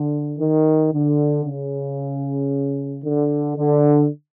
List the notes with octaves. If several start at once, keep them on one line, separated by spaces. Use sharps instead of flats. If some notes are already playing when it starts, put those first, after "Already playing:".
Already playing: D3
D#3
D3
C#3
D3
D3